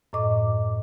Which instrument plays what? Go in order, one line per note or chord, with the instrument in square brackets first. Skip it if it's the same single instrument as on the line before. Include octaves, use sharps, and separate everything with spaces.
[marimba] F#2 A2 D#5 D6